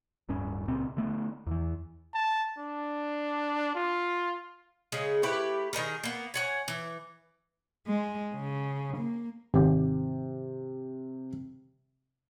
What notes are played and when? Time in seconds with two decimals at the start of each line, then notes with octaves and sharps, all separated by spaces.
0.29 D1 G2 C#4
0.68 C#2 A#2 C4
0.97 D3 A3 B3
1.47 E2 E3
2.14 A5
2.58 D4
3.75 F4
4.92 C#3 G#3 G#4
5.23 A3 E4 G4 B4
5.73 D#3 D#4 G#4 A#4
6.04 A#3 B3
6.34 C#5 F#5 G#5
6.68 E3
7.88 G#3
8.35 C#3
8.98 A#3
9.54 G#1 C3 G4